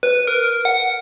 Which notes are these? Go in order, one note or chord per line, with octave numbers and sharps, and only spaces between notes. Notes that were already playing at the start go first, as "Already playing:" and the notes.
B4
A#4
F#5